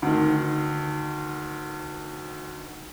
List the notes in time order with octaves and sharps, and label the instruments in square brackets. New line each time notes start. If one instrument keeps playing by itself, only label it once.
[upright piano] D2 D#3